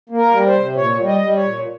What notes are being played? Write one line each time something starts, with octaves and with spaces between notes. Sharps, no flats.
A#3
A#4
G3
C5
C3
A#2 C#5
G3
D#5
G3
C#5
A#2